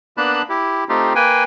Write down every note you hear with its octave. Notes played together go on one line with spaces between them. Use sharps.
A#3 B3 D4 A5 B5 F#6
E4 G4
A3 C4 D#4 F4 G4
A#3 B4 G5 G#5